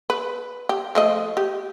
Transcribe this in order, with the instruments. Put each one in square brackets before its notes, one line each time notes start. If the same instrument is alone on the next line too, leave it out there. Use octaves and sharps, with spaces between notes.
[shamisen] B4
G4
F3 A3 D#5
G4